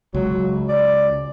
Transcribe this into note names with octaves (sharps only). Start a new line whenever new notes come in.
C#2 F#3
D5